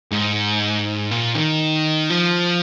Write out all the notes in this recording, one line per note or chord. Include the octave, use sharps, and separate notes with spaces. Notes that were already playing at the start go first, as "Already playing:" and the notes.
G#2
A#2
D#3
F3